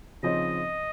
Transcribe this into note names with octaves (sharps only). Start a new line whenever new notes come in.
C#3 F3 C4 D#4 D#5